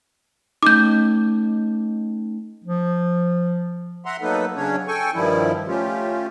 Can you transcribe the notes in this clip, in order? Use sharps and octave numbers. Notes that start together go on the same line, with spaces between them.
A3 C#4 D#4 D6 G6
F3
E5 F#5 A#5 C6
F#3 A#3 B3 D#4 A4 B4
C#3 F#3 C#4 D4 C#5
A4 G5 G#5 C#6
G2 D#3 F3 G3 E4
A3 C#4 F4 G4